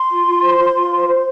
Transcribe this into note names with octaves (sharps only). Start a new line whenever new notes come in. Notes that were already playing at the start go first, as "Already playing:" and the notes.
Already playing: C6
F4
F4
C5
F4
F4
C5
C5